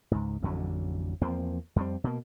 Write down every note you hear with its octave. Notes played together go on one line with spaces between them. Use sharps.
C#2 G#2
A1 F2 D3 F#3
E2 F3 A#3 C4
F2 G3 C4
B2 A#3